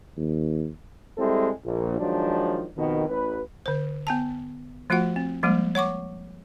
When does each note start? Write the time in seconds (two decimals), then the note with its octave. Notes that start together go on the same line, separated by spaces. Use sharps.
0.17 D#2
1.18 G3 G#3 C4 E4 A4
1.64 A#1
1.99 D#3 F3 F#3 G#3 D4
2.76 F2 B2 D#3
3.08 A1 B4
3.66 D3 C5
4.07 B3 G#5 A5
4.90 F3 A3 F4 F#4 F#5
5.16 C4
5.43 F3 G3 G#3 A#3
5.75 C#5 F#5 C#6 D6